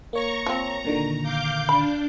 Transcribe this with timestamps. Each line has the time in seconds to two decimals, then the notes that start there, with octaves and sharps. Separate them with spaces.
0.13 A#3 C#5 A#5 C#6
0.46 F3 C4 A#5
0.85 A#2 D3 D#3
1.23 F5 D6 G6
1.69 D4 B5